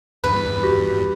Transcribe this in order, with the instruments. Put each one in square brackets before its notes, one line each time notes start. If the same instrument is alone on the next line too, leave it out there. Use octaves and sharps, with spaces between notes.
[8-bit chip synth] E2 G2 [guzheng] B4
[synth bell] F#4 G4